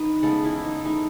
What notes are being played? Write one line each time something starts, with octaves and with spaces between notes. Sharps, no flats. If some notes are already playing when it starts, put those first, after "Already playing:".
Already playing: D#3 D#4 B4 D#5
C#3 G#3 A3 B3 A4
E3 E4
D#4
E3 A3 D#4